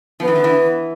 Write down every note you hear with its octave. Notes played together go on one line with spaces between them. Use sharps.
F3 B3
E3
D3
E3